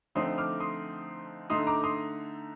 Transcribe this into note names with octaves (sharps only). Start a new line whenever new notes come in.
D3 F3 A3 C4 D#4 C6 D#6
D6 F6
C6 D#6
D3 A3 D#4 C6 D#6
A#5 D6
C6 D#6